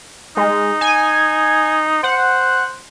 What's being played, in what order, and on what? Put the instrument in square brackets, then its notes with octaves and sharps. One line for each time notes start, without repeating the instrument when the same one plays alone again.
[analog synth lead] G#3 [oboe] D#4
[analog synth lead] G#5
[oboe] C5 [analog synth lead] F#5